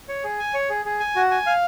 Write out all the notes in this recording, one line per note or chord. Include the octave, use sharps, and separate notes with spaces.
C#5
G#4
G#5
C#5
G#4
G#4
G#5
F#4
G#5
F5